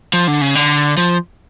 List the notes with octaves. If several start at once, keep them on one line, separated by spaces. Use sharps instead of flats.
F3
D3
C#3
D3
F3